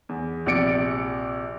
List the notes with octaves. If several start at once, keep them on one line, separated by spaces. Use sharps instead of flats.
E2
A#1 C3 D5 C#7 D7